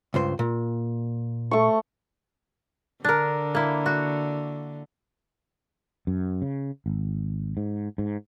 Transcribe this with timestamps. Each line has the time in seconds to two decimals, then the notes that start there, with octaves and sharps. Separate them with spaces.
0.14 C#2 G2 C5
0.39 A#2
1.51 A3 C#6
3.04 D3 D4 A#4
3.55 A#3 E4
3.86 F#4
6.07 F#2
6.42 C#3
6.86 G#1
7.57 G#2
7.98 G#2